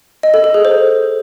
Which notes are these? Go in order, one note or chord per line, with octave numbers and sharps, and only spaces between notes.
D#5
A4
A4
G#4
C5